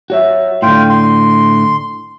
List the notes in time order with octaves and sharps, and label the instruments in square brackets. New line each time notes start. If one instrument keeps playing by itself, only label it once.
[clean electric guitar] F#4 C#5 E5
[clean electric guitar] A2 D3 [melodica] F4 G5
[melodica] C6